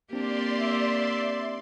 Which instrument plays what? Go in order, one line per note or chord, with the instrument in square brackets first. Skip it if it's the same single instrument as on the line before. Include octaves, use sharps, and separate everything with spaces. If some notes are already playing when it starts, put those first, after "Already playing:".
[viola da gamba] A#3 G4 [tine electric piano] C4 D4 [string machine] D5 C6
[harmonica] E5